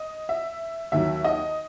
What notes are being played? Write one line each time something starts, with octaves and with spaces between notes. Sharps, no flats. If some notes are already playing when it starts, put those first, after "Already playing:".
Already playing: D#5
E5
D#2 D#3 F#3 E5
D#5